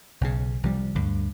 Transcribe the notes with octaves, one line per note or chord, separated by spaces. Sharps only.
B1 C#3
C2 F3 G3
D2 G2 D3